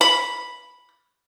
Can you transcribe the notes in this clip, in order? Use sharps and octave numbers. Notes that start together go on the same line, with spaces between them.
B5